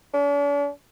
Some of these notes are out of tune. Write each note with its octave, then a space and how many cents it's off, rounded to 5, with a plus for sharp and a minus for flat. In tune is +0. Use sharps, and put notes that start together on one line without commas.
D4 -45